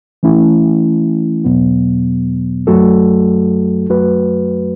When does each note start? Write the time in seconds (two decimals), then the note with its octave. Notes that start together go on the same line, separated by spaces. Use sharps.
0.23 E3 A3 C#4 E4
1.44 E2 B2 F#3 B3
2.67 F#2 F#3 A3 F#4 A4
3.89 F#2 F#3 A3 F#4 B4